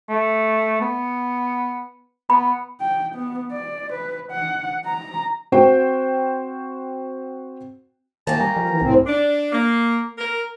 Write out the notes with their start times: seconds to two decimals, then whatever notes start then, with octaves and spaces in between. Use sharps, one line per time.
0.09 A3
0.81 B3
2.30 B3 B5
2.80 G5
3.15 B3
3.52 D5
3.93 B4
4.32 F#5
4.85 A#5
5.52 C4 F#4 C5 G5
8.27 D#3 A#3 C#4 G4 A5
8.40 G3 A#5
8.57 F3
8.70 E3
8.82 C2 A2 C4
9.07 D4
9.52 A#3
10.18 A#4